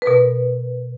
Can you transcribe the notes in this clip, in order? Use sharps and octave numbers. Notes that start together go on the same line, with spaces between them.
B4
B2 A#4